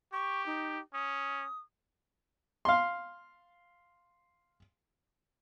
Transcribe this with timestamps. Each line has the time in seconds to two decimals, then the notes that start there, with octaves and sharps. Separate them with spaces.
0.13 G4 C#6
0.46 D#4
0.94 C#4 D#6
2.65 F5 C6